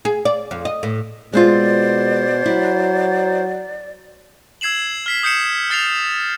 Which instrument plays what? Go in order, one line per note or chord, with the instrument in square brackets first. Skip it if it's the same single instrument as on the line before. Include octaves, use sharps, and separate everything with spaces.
[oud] G#4
D5
F2
D#5
A2
[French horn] B2 [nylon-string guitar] G#3 C4 F4 [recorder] C5 [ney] D5
[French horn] F#3 [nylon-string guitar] E4
[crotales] E6 G#6 C7 E7 F#7
F6 B6 C7
D#6 G6 C7 C#7 E7
F6 A6 C7 C#7 F7